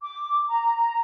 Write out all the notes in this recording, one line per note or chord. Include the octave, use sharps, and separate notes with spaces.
D6
A#5